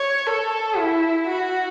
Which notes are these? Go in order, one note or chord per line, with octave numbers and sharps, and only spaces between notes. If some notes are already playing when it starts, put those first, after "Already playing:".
Already playing: C#5
A4
E4
F#4